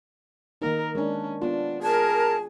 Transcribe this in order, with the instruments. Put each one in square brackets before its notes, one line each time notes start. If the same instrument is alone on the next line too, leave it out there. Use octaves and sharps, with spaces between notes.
[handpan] D#3 A#3 D#4 [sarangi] A#4
[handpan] G#3 D4 [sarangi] C#4
[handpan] B3 F4 [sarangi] D4
[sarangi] G#4 [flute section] A#4 G#6 [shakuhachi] A5